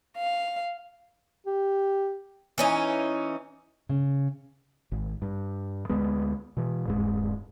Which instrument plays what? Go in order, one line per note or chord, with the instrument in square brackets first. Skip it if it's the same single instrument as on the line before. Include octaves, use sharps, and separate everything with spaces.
[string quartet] F5
[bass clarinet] G4
[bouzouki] E3 C#4 D#4
[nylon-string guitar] C#3
[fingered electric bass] G#1
G2
D2 G#3 B3
B2 E3
D#1 G2 G#3